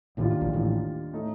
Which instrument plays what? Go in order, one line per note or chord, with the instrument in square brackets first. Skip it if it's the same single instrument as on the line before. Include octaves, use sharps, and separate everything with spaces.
[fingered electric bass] A1 A2 [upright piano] D#2 D#3 G3 D4 F4
[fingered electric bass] A#1 A#2
A1 A2
[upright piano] A2 A3 D#4